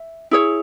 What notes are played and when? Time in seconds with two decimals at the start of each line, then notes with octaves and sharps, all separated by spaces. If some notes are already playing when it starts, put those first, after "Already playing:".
Already playing: E5
0.31 E4 G#4 C#5